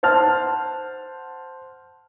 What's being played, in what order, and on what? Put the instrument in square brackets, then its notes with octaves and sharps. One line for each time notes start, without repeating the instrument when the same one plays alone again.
[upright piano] C5 F#5 A5 F6